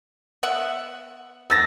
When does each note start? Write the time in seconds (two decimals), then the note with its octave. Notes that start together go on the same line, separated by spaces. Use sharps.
0.43 B3 E5 F#5
1.50 B3 D#4 E6 A6 A#6